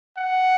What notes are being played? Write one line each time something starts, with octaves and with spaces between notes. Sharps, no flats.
F#5